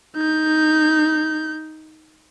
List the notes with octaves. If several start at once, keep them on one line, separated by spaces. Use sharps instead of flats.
D#4 G6